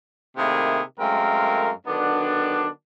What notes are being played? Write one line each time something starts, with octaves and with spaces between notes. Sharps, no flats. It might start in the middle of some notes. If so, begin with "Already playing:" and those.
C3 D#3 A3 A#3 E4 G#4
F#2 G#3 A3 C4 A#4 F5
D3 D#3 F#3 B3 D4